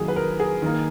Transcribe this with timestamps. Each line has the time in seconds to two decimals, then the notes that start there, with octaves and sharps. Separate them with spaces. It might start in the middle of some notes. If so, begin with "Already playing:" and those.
Already playing: D#3 F#3 A#3 G#4
0.08 B4
0.16 A#4
0.40 G#4
0.62 D#3 A#3